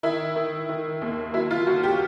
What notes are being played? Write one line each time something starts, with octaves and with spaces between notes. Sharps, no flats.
D#3 E4
D#3
D#3
D#2
F#3 E4
F4
G1 F#4
G4